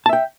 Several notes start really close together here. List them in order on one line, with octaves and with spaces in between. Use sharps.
A5 E5 G5